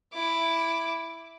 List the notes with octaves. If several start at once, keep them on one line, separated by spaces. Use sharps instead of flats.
E4 D6